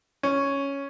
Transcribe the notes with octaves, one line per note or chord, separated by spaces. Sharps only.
C#4